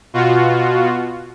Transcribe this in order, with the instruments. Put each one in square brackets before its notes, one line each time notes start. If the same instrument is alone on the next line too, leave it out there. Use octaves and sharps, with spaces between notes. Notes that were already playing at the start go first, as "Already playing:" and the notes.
[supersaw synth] B2 F4 F#4